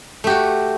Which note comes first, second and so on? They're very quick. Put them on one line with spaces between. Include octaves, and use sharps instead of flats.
A3 G4 F#4